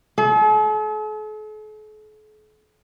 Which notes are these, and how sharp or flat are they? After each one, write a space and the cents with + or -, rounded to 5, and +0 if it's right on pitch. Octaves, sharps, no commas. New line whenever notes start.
A4 -45